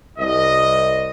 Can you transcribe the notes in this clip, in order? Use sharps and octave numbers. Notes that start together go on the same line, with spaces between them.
C2 D#5